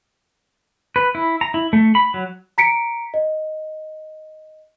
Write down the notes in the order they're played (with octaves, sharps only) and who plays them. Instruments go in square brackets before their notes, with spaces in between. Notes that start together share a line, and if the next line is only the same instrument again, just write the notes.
[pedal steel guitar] B4
E4
A#5
E4
A3
B5
F#3
[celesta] A#5 B6 C#7 D7
D#5